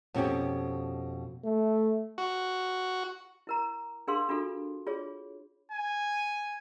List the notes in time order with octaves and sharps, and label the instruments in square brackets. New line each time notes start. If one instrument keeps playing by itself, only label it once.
[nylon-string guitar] F2 B2 C#4 G4
[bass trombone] A3
[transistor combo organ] F#4
[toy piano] E4 A#4 A#5
D4 G#4 A#4 F5 C6
D4 F4 F#4 A4
F4 G#4 C#5
[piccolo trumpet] G#5